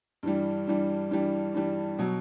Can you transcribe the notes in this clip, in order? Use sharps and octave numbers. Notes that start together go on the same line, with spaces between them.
G2 E3 G3
G2 E3 G3
G2 E3 G3
G2 E3 G3
B2 F#3